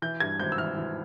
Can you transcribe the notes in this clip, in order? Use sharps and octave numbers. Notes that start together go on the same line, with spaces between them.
E3 G6
G2 G#6
G#1 G6
E6
E3 F6
E3